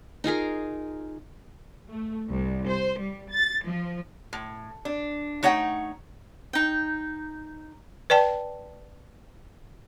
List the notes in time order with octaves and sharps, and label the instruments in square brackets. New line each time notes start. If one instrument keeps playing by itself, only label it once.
[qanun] D#4 F4 G#4 A#4
[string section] A3
C2
C5
G3
A6
F3
[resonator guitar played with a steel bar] A2
D4
A3 D#4 C#5 F#5 G5
[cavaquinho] D#4 G5
[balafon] B4 D5 G5 A5